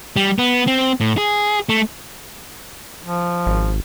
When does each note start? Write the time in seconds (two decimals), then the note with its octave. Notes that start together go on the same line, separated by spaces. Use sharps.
0.16 G3
0.38 B3
0.67 C4
1.00 A2
1.17 G#4
1.69 A3
3.03 F3
3.46 G#1